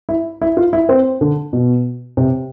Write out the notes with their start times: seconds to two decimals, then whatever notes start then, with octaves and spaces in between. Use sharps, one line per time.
0.09 E4
0.41 E4
0.57 F4
0.73 E4
0.89 C4
1.21 D3
1.53 B2
2.17 C3